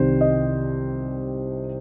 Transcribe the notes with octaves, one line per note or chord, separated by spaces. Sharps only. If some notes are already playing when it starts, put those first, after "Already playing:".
Already playing: C2 C3 D#3 C5
D#5